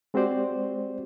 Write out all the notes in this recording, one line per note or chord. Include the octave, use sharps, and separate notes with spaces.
G#3 C4 F#4 G4 C5 D5